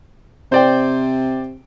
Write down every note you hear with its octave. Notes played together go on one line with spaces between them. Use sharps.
C3 C5 D5 G5